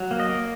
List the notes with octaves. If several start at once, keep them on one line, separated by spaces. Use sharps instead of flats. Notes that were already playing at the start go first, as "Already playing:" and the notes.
Already playing: F#3
A#3
D#5
A#3